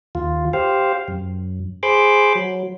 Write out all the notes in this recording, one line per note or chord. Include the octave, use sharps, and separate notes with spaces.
D#2 F4
G4 C5 F5
F#2
G#4 C5 B5 C6 D6
F#3